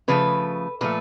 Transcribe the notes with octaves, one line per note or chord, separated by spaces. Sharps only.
C#3 F3 A3 B4
A#2 F3 A3 B4